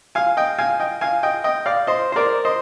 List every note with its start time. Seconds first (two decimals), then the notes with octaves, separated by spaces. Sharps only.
0.15 F5 G#5
0.37 D#5 G5
0.58 F5 G#5
0.80 D#5 G5
1.01 F5 G#5
1.23 D#5 G5
1.44 D#5 G5
1.66 D5 F5
1.87 C5 D#5
2.12 C5
2.16 A#4 D5
2.45 C5 D#5